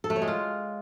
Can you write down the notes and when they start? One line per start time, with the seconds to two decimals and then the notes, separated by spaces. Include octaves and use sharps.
0.04 A4
0.10 A3
0.16 C#5
0.22 G#3
0.28 F4